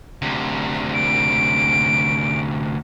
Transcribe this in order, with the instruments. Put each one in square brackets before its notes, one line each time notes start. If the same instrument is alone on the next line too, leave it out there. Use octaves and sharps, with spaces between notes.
[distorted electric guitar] D2 C3
[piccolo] D7